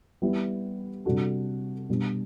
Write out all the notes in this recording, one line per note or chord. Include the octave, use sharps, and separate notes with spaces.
G3 B3 E4 G4
C3 G3 D4 F#4 A4
B2 G3 D4